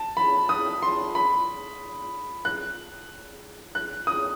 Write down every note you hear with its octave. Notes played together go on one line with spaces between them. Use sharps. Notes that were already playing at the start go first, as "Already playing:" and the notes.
Already playing: A5
B5
D#6
C6
B5
F#6
F#6
D#6